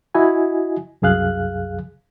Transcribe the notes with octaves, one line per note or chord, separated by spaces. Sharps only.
E4 F#4 D#5 G#5
C2 F#2 G#4 F5 F#6